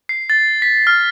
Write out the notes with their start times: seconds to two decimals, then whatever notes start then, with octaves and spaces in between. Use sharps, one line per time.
0.09 C7
0.30 A6
0.62 B6
0.87 F6